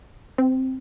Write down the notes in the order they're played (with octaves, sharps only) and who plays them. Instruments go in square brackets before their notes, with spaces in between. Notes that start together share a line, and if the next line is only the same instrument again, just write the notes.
[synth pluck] C4